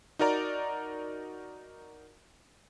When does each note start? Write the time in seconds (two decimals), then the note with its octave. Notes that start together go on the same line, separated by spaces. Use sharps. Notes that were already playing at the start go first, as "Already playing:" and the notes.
0.19 D#4 F#4 A#4 D5 A#5